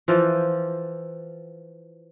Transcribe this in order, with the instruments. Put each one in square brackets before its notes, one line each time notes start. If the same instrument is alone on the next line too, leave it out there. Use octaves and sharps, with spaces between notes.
[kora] E3 F3 F4 G5